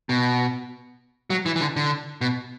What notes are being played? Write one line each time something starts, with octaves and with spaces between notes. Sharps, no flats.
B2
F#3
E3
E3
D3
D3
B2